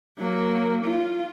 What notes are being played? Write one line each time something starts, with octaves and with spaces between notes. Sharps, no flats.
F#3 A#3
F4